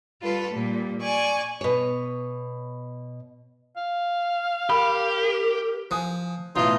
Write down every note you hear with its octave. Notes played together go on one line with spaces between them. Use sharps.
G3 F4 A4 B4
A#2 G3
D5 G#5 C#6
B2 C#5
F5
G4 A#4 B5
F3 G#5 D#6 F#6
B1 A2 E3 B3 D#4 F4 E5